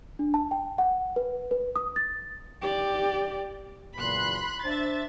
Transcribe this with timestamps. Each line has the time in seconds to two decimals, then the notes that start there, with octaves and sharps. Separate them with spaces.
0.19 D4
0.34 A5
0.51 G5
0.78 F#5
1.16 B4
1.51 B4
1.76 D#6
1.96 A6
2.62 G4 D5
3.96 F#1 E2 A#2 B5 C6 F#6
4.64 D4 C5 E5 A6